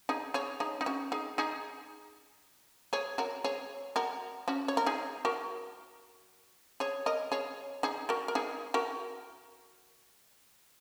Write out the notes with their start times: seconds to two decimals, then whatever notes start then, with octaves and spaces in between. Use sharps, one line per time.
0.09 D#4 G#4
0.34 G#4 C#5
0.60 D#4 G#4
0.81 D#4
0.86 C#4 F#4
1.12 D#4 G#4
1.38 D#4 G#4
2.93 G#4 C#5
3.18 F#4 A#4
3.44 G#4 C#5
3.96 F#4 A#4
4.48 C#4 F#4
4.68 C#5
4.77 A#4
4.86 D#4 G#4
5.25 F#4 A#4
6.80 G#4 C#5
7.06 A#4 D#5
7.32 G#4 C#5
7.83 D#4 G#4
8.09 F#4 A#4
8.28 A#4
8.35 D#4 G#4
8.74 F#4 A#4